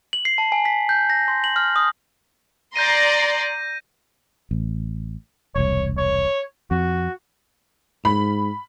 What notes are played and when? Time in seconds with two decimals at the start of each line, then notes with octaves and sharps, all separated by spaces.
0.13 F#7
0.25 C7
0.38 A5
0.52 G#5
0.65 B6
0.89 G6
1.10 A#6
1.28 C6
1.44 F#7
1.56 F6
1.76 D#6
2.76 D5 A#5 C6 G6 A#6 D#7
4.51 A1
5.55 E1 C2 C#5
5.98 C#5
6.71 F2 F#4
8.05 G#2 B5